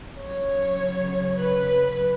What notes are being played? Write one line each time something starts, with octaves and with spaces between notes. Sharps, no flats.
C#3 F#3 C#5
B4